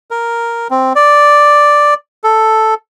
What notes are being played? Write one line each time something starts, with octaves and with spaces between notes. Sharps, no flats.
A#4
C4
D5
A4